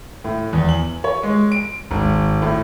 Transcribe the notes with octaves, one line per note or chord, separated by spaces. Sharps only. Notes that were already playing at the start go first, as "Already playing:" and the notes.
A2
E2
F#7
C#5
G#3
D7
G#1
A2